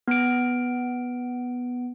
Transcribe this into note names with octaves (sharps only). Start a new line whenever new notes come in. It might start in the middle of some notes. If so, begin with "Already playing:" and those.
B3 D7